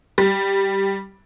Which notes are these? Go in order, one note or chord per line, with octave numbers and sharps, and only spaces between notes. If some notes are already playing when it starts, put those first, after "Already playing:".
G3